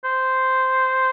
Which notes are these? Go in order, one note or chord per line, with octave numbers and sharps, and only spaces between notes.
C5